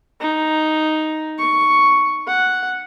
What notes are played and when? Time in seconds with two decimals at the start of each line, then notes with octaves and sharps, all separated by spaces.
0.21 D#4
1.39 C#6
2.28 F#5